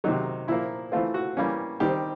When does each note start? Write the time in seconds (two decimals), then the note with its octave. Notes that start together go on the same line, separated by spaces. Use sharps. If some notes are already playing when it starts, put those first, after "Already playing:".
0.04 C3 D#3 F#3 D#4
0.48 A#2 F3 A#3 E4
0.92 E3 A3 C4 F4
1.14 F#4
1.37 E3 G3 A#3 C#4
1.80 D#3 G3 C4 G4